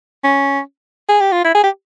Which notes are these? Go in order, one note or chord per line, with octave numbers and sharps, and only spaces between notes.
C#4
G#4
G4
F4
E4
G#4
G4